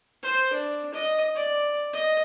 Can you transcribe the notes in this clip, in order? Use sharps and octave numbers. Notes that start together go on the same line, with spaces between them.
C5
D4
D#5
D5
D#5